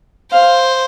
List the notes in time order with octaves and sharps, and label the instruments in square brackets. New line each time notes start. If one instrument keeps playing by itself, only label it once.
[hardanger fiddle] C5 [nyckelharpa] F5